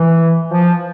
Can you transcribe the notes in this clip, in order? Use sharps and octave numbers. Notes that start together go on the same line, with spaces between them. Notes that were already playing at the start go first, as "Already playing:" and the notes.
Already playing: E3
F3